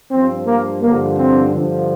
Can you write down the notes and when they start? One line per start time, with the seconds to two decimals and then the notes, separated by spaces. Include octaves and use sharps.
0.11 G2 F3 C4
0.46 A#3
0.82 G2 D3 F3 A#3
1.18 C4
1.53 G2 D3 F3